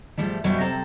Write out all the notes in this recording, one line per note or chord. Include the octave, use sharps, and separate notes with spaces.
G#2 F3 G3 A3
F#2 B2 F#3 G3 G4 E5
C3 C4 A4 A#5